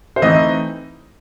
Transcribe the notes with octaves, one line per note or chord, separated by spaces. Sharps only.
C5
E3 A3 C4 D#4 D#5